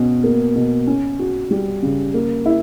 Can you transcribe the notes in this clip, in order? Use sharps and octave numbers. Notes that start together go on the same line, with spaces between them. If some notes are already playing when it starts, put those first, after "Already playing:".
Already playing: B2 C#4
A#3
B2
C#4
F#4
G3
C#3
A#3
E4